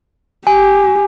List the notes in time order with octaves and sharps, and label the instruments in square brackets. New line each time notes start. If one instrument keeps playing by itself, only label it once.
[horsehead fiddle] G4 [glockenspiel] G#5